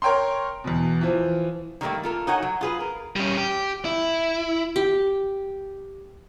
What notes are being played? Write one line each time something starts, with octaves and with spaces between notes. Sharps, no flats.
A#4 C#5 G5 A#5 C6
E2 B2
E3 F3
D#3 F#3 G3 A3 A#3
F4 A4 A#4
D#4 F#4 C#5 F#5 G#5
F#3
F4 G#4 B4
A#4
G3 C#4
G4
E4
G4